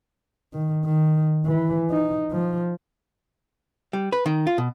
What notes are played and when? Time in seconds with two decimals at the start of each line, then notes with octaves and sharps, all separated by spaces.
0.53 D#3
0.85 D#3
1.46 E3
1.90 D#4
2.31 F3
3.93 G3
4.12 B4
4.26 D#3
4.47 F4
4.58 B2